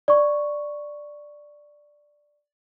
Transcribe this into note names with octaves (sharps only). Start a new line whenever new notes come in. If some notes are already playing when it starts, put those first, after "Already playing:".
D5 C#6